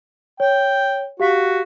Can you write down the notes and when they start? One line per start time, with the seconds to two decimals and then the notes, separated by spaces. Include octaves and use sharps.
0.40 C#5 G5
1.20 F#4 G4 F5 B6